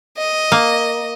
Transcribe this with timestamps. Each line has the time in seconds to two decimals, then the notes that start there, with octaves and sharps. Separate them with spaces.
0.18 D#5
0.52 A#3